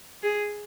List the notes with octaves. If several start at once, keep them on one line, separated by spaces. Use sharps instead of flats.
G#4